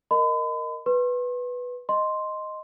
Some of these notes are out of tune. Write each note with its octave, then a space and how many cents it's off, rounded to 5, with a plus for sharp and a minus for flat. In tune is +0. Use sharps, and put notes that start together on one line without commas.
A#4 +0 D#5 -5 B5 +45
B4 +0 C6 +45
D#5 +0 C6 +0